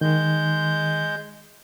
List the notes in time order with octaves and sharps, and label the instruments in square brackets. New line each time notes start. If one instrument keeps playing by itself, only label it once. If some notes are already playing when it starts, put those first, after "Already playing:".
[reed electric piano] D#3 [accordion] G#3 G6